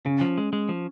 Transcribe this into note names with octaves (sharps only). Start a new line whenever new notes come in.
C#3 C#4
F3
G#3
G#3
F3